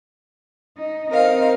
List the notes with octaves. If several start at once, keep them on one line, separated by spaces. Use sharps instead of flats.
D#4
C4 D#4 A#4 C5 F5